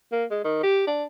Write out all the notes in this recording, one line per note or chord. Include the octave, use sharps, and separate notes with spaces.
A#3
G#3
D#3
G4
D4